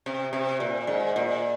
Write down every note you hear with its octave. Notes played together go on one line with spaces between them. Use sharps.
C3
C3
A#2
G#2
A#2